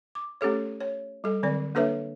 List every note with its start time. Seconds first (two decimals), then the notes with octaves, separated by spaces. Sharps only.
0.15 D6
0.41 A3 C#4 G4 A4 C#5
0.81 C#5
1.24 G3 A4
1.43 D3 F#3 C4 D5
1.75 A#3 D4 A4 B4 C#5 E5